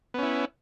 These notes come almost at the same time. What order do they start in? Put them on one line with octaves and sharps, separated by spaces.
B3 C#4 E4